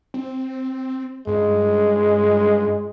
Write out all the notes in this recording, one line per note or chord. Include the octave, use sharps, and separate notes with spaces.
C4
G2 G#3